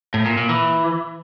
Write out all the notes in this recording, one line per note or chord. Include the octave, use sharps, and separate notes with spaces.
A2
A#2
A#2
E3